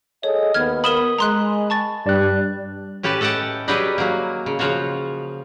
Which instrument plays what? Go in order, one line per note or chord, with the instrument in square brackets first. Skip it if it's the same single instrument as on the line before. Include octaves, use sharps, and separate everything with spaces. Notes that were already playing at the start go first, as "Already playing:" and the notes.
[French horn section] G#4 A4 D#5 [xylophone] C#5
[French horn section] D#2 B3 [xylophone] F6 G#6
[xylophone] A#4 E7 F#7 [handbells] B5 D#6
[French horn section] G#3 [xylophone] A#5 C6 F#6
[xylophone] A5 C#6 A6
[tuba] G2 [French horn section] G3 D4 [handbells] D5 F#6
[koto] A2 C#4 G4 B4 A5
A4 D#5 F#5 G5 A5
F#3 G3 G4 G#4 B4 D#5
F#3 A#3
C#3
C#3 F3 F4 F#4 C#5